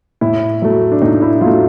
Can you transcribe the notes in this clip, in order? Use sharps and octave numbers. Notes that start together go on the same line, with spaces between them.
A2 E4
F#3 A3
D4
A2 D#4
E4
F#3 A3 F4